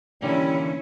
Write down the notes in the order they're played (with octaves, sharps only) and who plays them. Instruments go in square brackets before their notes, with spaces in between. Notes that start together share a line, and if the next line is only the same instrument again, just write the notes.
[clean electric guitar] D3 E3 A#3 [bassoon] G3 [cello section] C#4 E4 [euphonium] D4